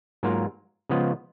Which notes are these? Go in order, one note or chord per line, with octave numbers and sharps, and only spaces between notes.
G#2 F#3 A#3 F4 A#4
C#3 F3 G#3 B3 F4